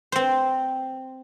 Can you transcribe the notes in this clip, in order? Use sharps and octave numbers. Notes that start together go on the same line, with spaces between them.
C4 C5